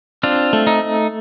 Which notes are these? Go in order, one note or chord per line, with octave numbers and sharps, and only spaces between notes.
C4 D4 F4
A3
D#4